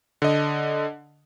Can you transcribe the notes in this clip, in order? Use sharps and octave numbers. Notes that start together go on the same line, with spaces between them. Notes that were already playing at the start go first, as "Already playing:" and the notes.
D3 D#5